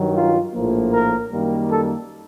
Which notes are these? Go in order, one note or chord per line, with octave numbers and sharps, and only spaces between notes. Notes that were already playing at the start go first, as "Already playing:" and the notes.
Already playing: G2 D#3 F#3
F4
A#1 A2 F3 A#3
A#4
F#2 D#3 G3 A#3
A4